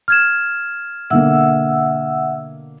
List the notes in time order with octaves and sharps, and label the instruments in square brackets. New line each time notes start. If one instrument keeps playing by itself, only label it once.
[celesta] F6 G#6 E7
[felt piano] B2 D3 A#3 [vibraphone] E5 F#5 E6